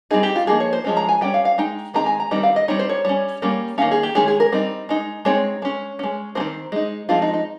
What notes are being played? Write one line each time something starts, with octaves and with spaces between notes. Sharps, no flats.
G3 C4 D#4 G#4
G4
F4
F3 A#3 D#4 G#4
C#5
C5
F3 G#3 C#4
A#5
G#5
G3 C#4 G5
F5
F5
G#3 D#4 G5
D#3 G#3 C4 D#4 A#5
G#5
A#5
D#3 G3 C4 D#4
F5
D#5
G3 C4 D#4 C#5
C5
C#5
G3 C#4 C#5
G3 A#3 C#4
D#3 A#3 C#4 F5
G#4
G4
D#3 G#3 C#4 G#4
G#4
A#4
G3 C4 D#4
G#3 D#4
G#3 C4 D#4 C#5
G#3 C#4
G#3 C#4
D#3 G#3 C4 C5
G#3 D#4
F3 G#3 C4 D#4 F4
D#4
D#4